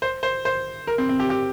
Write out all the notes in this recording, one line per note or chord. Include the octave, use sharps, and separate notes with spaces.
C5
C5
C5
A#4
C4
C4
G4
G4